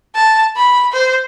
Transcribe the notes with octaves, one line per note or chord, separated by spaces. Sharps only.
A5
B5
C5